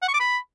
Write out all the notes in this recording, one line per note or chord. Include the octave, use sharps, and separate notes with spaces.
F#5
C#6
D6
B5